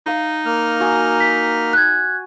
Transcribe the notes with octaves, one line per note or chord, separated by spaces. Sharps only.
D#4 E5 F5 D#6
A#3 F6
F#4 G#5 D#6
B6
F#6 G#6